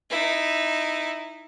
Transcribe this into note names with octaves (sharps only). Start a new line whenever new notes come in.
D#4 E4